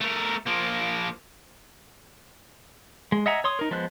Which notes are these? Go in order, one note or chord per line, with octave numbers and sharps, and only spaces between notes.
A3 A#4
F3 A#3
G#3
D#5 E5 F#5 G#5 A#5
C#5 C6 D#6
D#4 A#4
F3 G#3 B3 C5 F#6